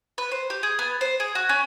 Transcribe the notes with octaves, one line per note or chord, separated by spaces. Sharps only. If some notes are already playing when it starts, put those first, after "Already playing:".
B4
C5
G4
G#4
B3
C5
G#4
F#4
C#4